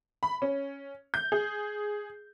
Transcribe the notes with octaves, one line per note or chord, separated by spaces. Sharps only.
B5
C#4
G6
G#4